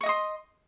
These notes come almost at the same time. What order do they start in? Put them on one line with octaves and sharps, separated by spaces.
C#6 D#5 D#6 C6